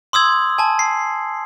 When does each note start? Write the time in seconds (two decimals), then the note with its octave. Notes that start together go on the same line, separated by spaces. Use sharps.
0.13 C6 D#6 E6 G#6 F#7
0.58 G#5 A5
0.79 C7